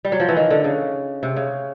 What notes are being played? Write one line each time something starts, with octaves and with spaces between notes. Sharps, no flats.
G3
F#3
F3
E3
D#3
D3
C#3
C3
C#3